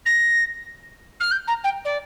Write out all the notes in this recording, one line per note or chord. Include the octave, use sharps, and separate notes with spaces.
A#6
F6
G6
A#5
G5
D5